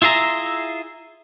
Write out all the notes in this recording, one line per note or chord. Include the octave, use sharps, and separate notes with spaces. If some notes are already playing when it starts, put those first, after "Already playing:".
E4 F4 G#4 E5 A#5